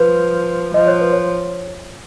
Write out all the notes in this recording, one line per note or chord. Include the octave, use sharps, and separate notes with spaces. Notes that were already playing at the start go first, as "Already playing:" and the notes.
Already playing: F3 B4
F3 D#5
C#5
B4
C#5